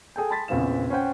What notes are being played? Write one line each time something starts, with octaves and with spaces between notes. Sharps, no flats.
G#4 A4 G5
A5 B5 C6 A6 B6
A#1 E2 C#3 C4 F5 E7
C#4 C5 F#5 G5